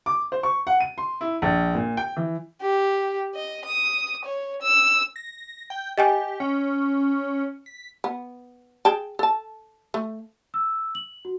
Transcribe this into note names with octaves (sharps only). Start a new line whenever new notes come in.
D6
C5
C#6
F#5
D#7
C6
E4
A#1
A#2
G5
E3
G4
D#5
D#6
C#5
E6
A#6
G5
G4 D#5 G5 G#5
C#4
B6
B3
G#4 G5 A5
A4 A5
A3
E6
F#7
F#4